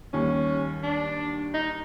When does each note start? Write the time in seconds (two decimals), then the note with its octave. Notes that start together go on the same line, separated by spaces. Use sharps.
0.13 D#2 D#3 G3 C#4
0.83 D4
1.54 D#4